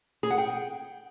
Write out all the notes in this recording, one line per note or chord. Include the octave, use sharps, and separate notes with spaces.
G#4
F#5
G5